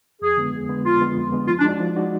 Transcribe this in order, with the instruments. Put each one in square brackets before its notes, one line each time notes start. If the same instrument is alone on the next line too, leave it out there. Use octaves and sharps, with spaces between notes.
[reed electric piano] F2 [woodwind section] G#4
[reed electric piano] D3 G#3 B3
F2
D3 G#3 B3
[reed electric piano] F2 [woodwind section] F4
[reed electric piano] D3 G#3 B3
F2
D3 G#3 B3
[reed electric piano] F3 [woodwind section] F4
[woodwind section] D4
[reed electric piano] G#3 D#4 F#4 D5
F3
G#3 D#4 F#4 D5